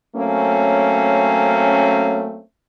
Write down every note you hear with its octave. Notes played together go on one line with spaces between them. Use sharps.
F#3 A3 A#3 C4 C#4